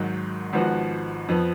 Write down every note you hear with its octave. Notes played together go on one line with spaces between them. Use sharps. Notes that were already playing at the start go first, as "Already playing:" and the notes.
Already playing: G#1 G#2 D#3 F#3
G#1 G#2 F3 B3 F#4
F2 F3 B3